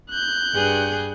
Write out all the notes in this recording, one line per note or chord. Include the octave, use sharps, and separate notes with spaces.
F#6 G6
G2 G#4